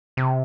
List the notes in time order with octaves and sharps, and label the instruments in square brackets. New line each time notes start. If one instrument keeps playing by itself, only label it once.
[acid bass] C3